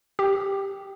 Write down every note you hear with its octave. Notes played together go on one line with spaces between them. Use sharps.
G4